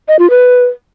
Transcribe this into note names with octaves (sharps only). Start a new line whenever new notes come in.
D#5
F4
B4